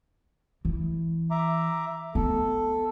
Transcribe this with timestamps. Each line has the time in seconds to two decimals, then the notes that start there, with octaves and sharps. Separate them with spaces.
0.65 E3
1.31 E5 A#5 D6
2.15 B3 A4